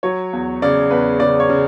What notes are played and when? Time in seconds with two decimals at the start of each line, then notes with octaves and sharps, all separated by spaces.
0.03 F#3 C#5
0.33 E2
0.62 C#3 D5
0.91 E2 B4
1.20 C#3 D5
1.40 C#5
1.50 C#3